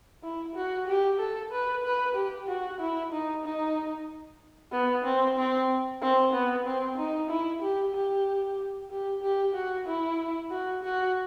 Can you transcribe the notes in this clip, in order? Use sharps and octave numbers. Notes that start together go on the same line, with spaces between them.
E4
F#4
G4
A4
B4
B4
G4
F#4
E4
D#4
D#4
B3
C4
C4
C4
B3
C4
D#4
E4
G4
G4
G4
G4
F#4
E4
F#4
F#4